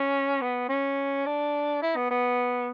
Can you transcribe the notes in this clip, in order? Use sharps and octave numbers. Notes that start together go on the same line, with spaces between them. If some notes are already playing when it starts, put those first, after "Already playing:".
Already playing: C#4
B3
C#4
D4
E4
B3
B3